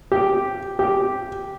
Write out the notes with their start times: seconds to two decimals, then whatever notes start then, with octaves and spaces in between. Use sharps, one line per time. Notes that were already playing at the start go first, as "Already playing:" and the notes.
0.12 G4
0.79 G4